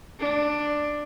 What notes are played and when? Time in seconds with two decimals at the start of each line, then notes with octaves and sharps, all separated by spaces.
0.19 D4